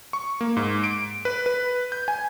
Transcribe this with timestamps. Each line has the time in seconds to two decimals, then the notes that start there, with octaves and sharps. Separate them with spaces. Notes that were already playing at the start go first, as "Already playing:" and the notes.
0.13 C#6
0.41 A#3
0.57 G#2
0.84 D7
1.25 B4
1.46 B4
1.92 G6
2.08 G#5